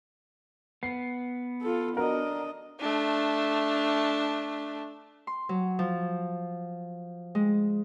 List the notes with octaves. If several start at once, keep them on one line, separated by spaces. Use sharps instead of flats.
B3 C7
F4 A4
D4 F#4 A#4 D#5
A3 D4
C6
F#3
F3
G#3